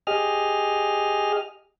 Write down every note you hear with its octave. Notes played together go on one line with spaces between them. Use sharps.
G4 G#4 D#5 F6